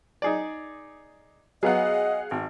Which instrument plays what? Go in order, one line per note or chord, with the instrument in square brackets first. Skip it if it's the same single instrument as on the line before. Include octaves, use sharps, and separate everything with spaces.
[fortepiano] D#4 G#4 D5
[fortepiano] F#3 B3 [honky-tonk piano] G#4 F5 F#5 [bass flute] D#5
[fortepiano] G#1 [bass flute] F#4